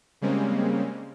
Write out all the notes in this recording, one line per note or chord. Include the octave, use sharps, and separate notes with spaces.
C#3 G3 G#3 A#3 C4 C#4